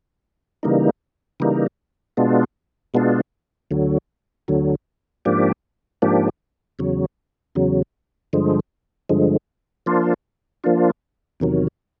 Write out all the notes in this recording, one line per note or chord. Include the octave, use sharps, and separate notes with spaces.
C#3 E3 G3 A#3 D#4
C#3 E3 G3 A#3 D#4
B2 G#3 B3 D4 F4
B2 G#3 B3 D4 F4
D2 D3 F#3
D2 D3 F#3
G#2 F3 A#3 D4 G4
G#2 F3 A#3 D4 G4
E2 C#3 F#3
E2 C#3 F#3
G2 D3 F3 G#3
G2 D3 F3 G#3
F3 A#3 D4 F4
F3 A#3 D4 F4
E2 C3 D#3 F#3